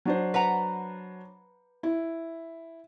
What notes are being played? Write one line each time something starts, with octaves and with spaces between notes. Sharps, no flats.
F#3 D4 C5
B4 F#5 A#5
E4